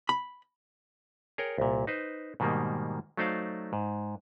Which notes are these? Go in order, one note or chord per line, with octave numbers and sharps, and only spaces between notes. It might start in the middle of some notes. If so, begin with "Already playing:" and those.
B5
G#4 A#4 C#5 G5
C2 A#2
D#4 B4 C5
G#2 B2 D#3 G3 A#3
F#3 A3 D#4 C5 D5 F5
G#2